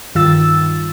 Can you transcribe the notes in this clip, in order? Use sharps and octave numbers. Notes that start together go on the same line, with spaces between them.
G2 D#3 F4 E6 A6